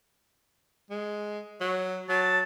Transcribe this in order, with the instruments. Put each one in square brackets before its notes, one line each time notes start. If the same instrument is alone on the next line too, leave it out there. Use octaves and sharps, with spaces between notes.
[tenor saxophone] G#3
F#3
[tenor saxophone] F#3 [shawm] A5